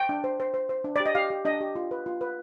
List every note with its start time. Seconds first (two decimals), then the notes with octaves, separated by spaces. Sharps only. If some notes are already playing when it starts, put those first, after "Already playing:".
Already playing: G5
0.09 D4
0.24 C5
0.40 C5
0.54 C5
0.69 C5
0.84 D4
0.96 G4 D5
1.06 D#5
1.15 G4 F5
1.30 G4
1.45 D4 D#5
1.61 G4
1.75 F4
1.91 B4
2.06 F4
2.21 B4